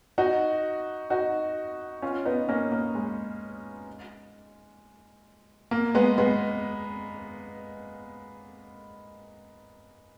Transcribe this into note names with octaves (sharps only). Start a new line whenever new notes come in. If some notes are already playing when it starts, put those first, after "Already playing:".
D#4 F#4
D#4 F#4
C#4 F4
B3 D#4
A#3 C#4
A#3
G#3
A#3
G#3 B3
G#3 B3